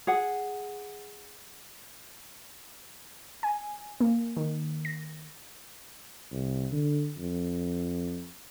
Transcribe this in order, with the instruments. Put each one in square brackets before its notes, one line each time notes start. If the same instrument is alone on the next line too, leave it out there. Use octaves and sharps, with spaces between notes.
[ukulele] G#4 F#5
[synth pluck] G#5
A#3
D#3
A#6
[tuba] C2
D3
F2